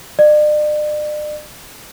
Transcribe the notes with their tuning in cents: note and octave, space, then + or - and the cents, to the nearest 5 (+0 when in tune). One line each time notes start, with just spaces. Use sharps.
D5 +40